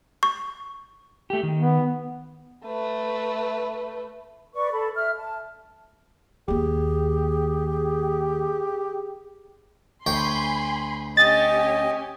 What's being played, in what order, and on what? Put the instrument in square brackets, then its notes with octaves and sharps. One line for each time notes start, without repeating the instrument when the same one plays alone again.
[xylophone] C#6
[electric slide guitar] A3 G4
D#3
[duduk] B3
[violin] A3 B4
[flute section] B4 D5 C#6
A4 B5
E5 F6
A5
[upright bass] D#2 A#3 [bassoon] G4 [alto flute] G#4
[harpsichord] D2 C#5 G5 [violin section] G#5 B5 C6
[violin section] C#4 G4 G#5 [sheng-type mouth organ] D#5 [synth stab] A6